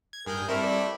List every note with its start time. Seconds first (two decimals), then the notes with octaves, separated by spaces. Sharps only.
0.13 G#6
0.27 G2 G#4 A#4 G6
0.49 G3 A3 C4 E4 A#4
0.63 D5